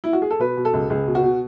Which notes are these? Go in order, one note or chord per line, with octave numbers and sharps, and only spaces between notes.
E4
F#4
G#4
A4
B2 B4
B2
A4
C#2
C#2 G#4
B2
F#4
B2